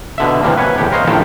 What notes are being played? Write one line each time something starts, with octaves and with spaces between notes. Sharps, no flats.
B2 D3 E5
C3 E3 G3 A#3
B4 C#5 F#5 G#5
E2 A2 G4
A#4 C5 C#5 D#5 F5
A#1 A2 D#3 G4 A4 E5